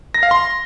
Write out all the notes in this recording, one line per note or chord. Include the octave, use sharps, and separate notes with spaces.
A#6
F5
C6